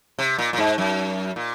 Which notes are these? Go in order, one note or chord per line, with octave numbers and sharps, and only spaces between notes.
C3
A#2
A#2
G#2
F#2
A#2